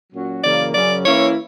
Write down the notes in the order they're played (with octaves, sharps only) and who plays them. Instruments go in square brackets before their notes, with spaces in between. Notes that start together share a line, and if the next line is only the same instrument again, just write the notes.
[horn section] A#2 F#3 C#4 F#4
[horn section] F#2 C#3 E3 A#3 [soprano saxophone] D5
[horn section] F#2 C#3 F#3 C#4 [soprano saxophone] D5
[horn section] E3 A#3 C#4 E4 [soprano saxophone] C#5